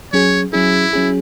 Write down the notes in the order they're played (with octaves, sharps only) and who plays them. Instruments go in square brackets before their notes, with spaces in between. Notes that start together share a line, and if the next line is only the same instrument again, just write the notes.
[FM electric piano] F#3 C#4 G#4 [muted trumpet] C#5
[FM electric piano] F#3 C#4 G#4 [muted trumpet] E4
[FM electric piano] F#3 C#4 G#4